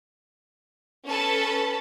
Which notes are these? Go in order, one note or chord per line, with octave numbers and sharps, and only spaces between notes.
C#4 A4 B4 A5